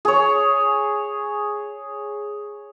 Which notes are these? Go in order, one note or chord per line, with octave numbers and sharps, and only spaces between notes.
G#4 C#5